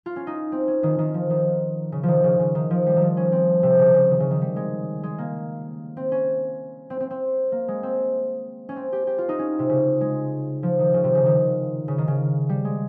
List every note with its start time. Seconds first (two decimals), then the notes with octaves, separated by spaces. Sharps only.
0.06 F4
0.16 C#4
0.27 D#4
0.52 C4
0.68 C#4
0.83 D#3
0.99 D#3
1.14 F3
1.30 D#3
1.92 C#3
2.03 D#3 F3
2.24 C#3
2.39 C#3
2.55 D#3
2.70 F3
2.86 G3
2.96 D#3
3.01 F3
3.17 C#4
3.32 C4
3.63 C3
3.79 C#3
3.94 C#3
4.11 D#3
4.20 C#3
4.31 D#3
4.41 G3
4.56 G#3
5.03 G#3
5.18 A#3
5.97 C4
6.12 C#4
6.90 C4
7.00 C4
7.10 C4
7.52 A#3
7.68 G#3
7.83 C4
8.69 C#4
8.76 C4
8.92 G4
9.07 G4
9.18 F4
9.29 D#4
9.39 C#4
9.59 C3
9.69 C#3
10.01 G#3
10.63 F3
10.79 D#3
10.94 C#3
11.04 C3
11.15 C#3
11.26 D#3
11.88 C#3
11.98 D#3
12.08 C#3
12.49 G3
12.64 G#3